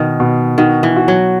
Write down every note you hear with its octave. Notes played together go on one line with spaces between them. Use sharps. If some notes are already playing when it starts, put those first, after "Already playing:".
Already playing: B2 D#3
B2
D#3 F#4
E3
F#4
F#3